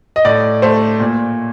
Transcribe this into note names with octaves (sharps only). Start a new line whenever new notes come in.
D#5
A2 D5
A3 C5
A#2